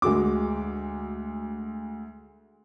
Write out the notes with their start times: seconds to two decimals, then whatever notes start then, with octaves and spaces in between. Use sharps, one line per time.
0.02 D2 G#3 F#4 D6